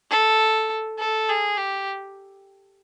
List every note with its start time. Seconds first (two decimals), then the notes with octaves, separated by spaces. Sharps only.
0.11 A4
0.99 A4
1.29 G#4
1.57 G4